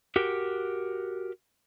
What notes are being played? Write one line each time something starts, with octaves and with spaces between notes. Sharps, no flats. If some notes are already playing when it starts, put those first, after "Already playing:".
F#4 G4 A#4